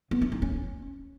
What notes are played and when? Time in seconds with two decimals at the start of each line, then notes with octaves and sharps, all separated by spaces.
0.11 B3
0.21 D4
0.32 D#4
0.42 C#4